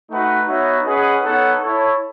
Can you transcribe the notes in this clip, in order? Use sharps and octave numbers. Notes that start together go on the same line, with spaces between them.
A3 D#4 F#4 B4 F#5
B3 D#4 F#4 C#5 E5
C#4 G#4 B4 D#5 F#5
B3 D#4 A4 C#5 F#5
E4 A4 C#5